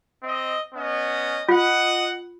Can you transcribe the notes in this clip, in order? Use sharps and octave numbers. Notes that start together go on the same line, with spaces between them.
C4 D#5
B3 C#4 D#5
F4 D#5 F#5